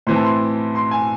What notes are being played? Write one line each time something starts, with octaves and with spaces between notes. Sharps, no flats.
A2 E3 C4 C6
A5
C6
C6
G#5